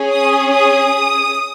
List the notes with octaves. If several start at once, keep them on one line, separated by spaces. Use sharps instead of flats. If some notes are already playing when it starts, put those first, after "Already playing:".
Already playing: C#4 G#4
D#6
D#6